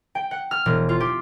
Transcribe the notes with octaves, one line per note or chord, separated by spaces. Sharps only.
G5
F#5
F6
E1
F4
G4